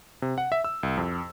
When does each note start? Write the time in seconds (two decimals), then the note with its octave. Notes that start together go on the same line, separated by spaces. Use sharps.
0.22 C3
0.38 F#5
0.52 E5
0.64 E6
0.83 C2
0.97 F2